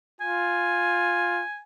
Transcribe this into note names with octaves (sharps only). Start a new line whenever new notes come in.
F4 G#5